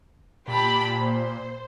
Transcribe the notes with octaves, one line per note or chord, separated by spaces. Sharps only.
A#2 G4 A5 B5
C5